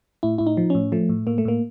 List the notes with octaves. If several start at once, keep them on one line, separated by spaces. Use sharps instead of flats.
A2 E4
A2 E4
D#4
F3
A2 C#4
F3 A3
A2
A2 A#3
A3
A2 A#3